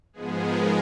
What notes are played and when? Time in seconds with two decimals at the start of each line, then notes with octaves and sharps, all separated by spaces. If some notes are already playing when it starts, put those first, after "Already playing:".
0.13 G#2 F3 G#3 B3 G#4
0.41 A#4